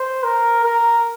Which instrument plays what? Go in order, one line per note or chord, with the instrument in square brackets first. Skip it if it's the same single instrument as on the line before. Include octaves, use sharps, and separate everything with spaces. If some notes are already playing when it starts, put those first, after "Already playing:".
Already playing: [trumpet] C5
A#4
A#4